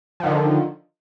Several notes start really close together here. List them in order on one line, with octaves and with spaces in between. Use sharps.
F3 D#3 D3